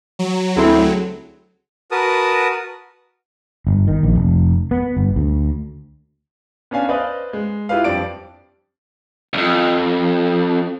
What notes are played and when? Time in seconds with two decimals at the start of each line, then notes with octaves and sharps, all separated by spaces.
0.19 F#3
0.57 D2 C4 E4 G#4 A4
1.91 F#4 A#4 B4 A5 D#6
3.67 G1
3.88 D#3
4.03 A#1
4.16 F1
4.71 B3
4.97 G1
5.16 D2
6.71 B3 C#4 D4 F5 G#5
6.89 B4 C5 D5 D#5 F5 D#6
7.33 G#3
7.69 E4 F4 G4 B4 F5
7.84 F2 G3 D4 D5 D7
9.33 C2 F2